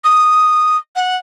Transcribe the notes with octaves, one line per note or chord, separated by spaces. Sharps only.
D#6
F#5